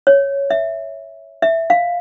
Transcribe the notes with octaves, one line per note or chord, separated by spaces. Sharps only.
C#5
E5
E5
F5